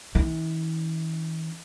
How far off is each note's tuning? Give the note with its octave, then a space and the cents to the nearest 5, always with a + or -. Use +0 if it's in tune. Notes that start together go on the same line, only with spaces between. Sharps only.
E3 -40 C#4 +0